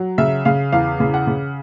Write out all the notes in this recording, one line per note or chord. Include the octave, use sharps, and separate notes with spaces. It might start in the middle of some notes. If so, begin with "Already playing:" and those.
Already playing: F#3
C#3 E5
C#3 F5
E2 F5
C#3
F#5
C#3